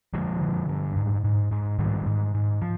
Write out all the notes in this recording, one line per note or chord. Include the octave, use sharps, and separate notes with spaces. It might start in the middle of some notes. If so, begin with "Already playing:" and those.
D3 F3 G#3
D3
G2
G#2
G#2
G#2
G#2 D#3 G3
G#2
G#2
F3